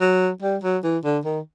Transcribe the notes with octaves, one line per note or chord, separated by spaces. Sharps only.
F#3
G3
F#3
E3
D3
D#3